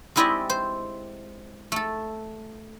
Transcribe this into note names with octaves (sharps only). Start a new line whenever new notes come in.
G#3 C4 E4 G4 D5 D#5
C5
A3 A4